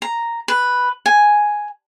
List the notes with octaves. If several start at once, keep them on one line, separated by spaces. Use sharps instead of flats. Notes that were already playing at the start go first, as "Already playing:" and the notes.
A#5
B4
G#5